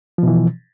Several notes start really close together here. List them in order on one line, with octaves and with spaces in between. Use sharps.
F3 B2 E3